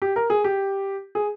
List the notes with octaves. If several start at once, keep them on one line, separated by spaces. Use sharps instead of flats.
G4
A#4
G#4
G4
G#4